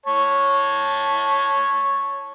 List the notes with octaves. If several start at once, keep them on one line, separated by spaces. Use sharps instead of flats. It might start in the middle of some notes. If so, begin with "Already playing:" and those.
C#5 A5